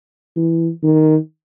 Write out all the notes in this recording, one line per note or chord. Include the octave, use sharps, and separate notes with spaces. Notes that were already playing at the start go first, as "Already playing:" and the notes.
E3
D#3